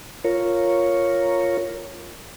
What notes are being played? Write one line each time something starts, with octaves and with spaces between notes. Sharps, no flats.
F4 A#4 C#5